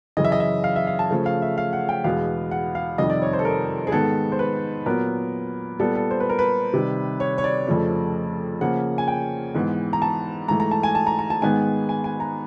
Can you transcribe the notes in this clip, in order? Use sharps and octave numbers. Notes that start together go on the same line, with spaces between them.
F#2 C#3 E3 D#5
E5
D#5
E5
F5
E5
F5
A5
C#3 F3 A3
F5
E5
F5
F#5
G5
E2 B2 G#3 B3 F5
F#5
F5
F2 C3 D#3 G3 D#5
D5
C#5
C5
A4
A#4
G#4
G#2 D#3 G#3 B3 A4
C5
B4
A#2 F#3 B3 A#4
A#2 G3 B3 A4
A4
C5
B4
A#4
B4
C3 D#3 G3
C#5
C#5
D5
F2 C#3 F3 A3
C#3 F3 A#3 F#5
G#5
G5
G#2 E3 G#3 B3
A#5
A5
G#2 E3 A3 A#5
A#5
A5
G#5
A5
A#5
A#5
A5
G#2 D#3 G#3 B3 G#5
G#5
G#5
A#5